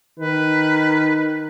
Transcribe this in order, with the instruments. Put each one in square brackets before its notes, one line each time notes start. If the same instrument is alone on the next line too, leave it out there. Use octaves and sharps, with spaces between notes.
[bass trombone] D#3 [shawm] B4